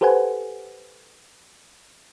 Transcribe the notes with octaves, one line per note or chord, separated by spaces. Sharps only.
G4 A4 B4 C5 F#5 G#5